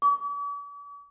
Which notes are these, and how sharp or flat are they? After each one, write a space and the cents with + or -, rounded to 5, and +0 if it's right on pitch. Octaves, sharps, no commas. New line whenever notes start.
D6 -45